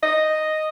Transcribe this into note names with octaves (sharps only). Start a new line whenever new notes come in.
D#5